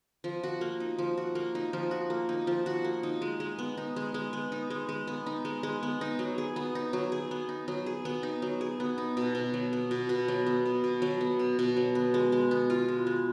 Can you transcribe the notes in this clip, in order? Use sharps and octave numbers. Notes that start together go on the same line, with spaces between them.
F3
F#4
A#3
D#4
F3
F#4
A#3
D#4
F3
F#4
A#3
D#4
F3
F#4
A#3
D#4
G#3
G#3
B3
D#4
G#3
G#3
B3
D#4
G#3
G#3
B3
D#4
G#3
G#3
B3
D#4
F#3
G#4
B3
D#4
F#3
G#4
B3
D#4
F#3
G#4
B3
D#4
F#3
G#4
B3
D#4
B2
B2
F#3
B3
B2
B2
F#3
B3
B2
B2
F#3
B3
B2
B2
F#3
B3
G#3
G#3
B3
F4
G#3
G#3